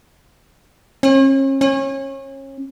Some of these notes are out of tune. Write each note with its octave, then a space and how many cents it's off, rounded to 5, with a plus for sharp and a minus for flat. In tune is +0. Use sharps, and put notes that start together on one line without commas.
C#4 -40
C#4 -30